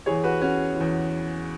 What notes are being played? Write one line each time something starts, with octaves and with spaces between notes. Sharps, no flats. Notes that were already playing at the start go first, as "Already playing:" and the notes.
E2 E3 G#4 C#5
F#4 B4
C#4 F#4
E2 E3